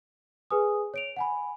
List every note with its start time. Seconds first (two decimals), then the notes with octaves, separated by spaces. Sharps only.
0.51 G#4 B4 G#5 D#6
0.94 C#5 D7 F7
1.16 F#5 G#5 B5